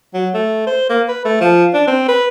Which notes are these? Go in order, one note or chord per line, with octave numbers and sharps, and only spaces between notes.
F#3
A3
C5
A#3
B4
A3
F3
D4
C4
B4